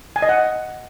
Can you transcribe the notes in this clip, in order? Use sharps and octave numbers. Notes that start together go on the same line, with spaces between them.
G#5
D#5
F#5